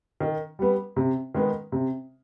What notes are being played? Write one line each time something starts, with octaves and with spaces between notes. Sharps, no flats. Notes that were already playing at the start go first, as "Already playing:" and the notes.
D#3
G3 B3
C3
D#3 G#3 B3
C3